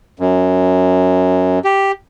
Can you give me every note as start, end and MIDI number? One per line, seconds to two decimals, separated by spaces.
0.19 1.59 42
1.64 1.92 67